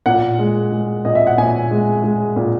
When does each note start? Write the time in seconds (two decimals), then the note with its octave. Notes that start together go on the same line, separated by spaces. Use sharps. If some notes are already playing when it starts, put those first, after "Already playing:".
0.06 A#2 F#5
0.39 G#3
0.72 G#3
1.05 A#2 D#5
1.15 E5
1.27 F#5
1.38 A#2 G#5
1.71 G#3
2.03 G#3
2.36 A#2